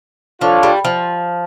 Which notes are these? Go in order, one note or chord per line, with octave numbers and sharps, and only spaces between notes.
F3 D4 F4 A4 C#5 F5
G3
F3